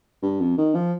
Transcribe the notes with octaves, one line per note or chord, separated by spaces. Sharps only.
G2
F2
D#3
F3